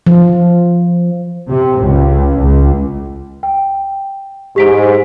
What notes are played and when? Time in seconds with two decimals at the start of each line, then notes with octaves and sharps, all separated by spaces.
0.07 F3
1.50 C3
1.81 C#2
2.40 C#2
3.43 G5
4.56 G#2 G4 B6 D7